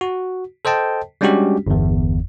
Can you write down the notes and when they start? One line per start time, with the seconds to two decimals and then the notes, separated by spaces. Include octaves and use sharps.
0.01 F#4
0.65 A4 C5 D#5 G5 A5
1.21 G3 G#3 C#4 D4 F#4 G4
1.67 G1 E2